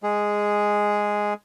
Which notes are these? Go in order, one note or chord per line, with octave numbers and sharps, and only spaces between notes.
G#3 G#4